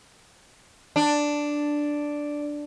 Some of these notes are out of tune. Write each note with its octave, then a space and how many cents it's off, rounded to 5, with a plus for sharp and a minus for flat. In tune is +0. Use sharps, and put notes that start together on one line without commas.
D4 +0